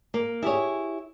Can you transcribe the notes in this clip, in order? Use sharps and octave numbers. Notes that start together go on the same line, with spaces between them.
A#3
E4 G4 G#4 C#5